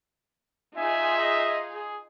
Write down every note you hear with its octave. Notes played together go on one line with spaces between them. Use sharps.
D#4 F4 G#4 E5 G#5
D#5
G#4